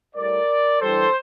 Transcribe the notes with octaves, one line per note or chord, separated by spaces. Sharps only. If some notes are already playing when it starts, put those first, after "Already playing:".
A2 G3 A#4 D5
G2 E3 G3 A4 C5